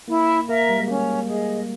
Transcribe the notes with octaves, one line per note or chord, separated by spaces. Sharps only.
A#3 E4
A#3 A#4 E5
G3
G#3
A#3 C#4
G#4 D#5